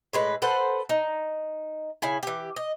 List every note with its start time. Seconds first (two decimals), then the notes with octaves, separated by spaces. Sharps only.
0.13 A2 G#3 B4
0.42 A4 B4 C5 F#5
0.89 D#4
2.02 C#3 E4 G#5
2.23 E3 G4
2.56 D#5